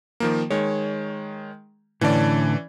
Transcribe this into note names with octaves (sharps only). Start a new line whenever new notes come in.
D#3 F3 A#3
D#3 G#3 C#5
A2 D3 E3 C#4 D5 A5